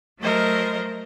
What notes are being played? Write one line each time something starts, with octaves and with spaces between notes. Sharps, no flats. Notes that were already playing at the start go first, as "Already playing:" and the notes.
F#3 A3 A#4 C5 D#5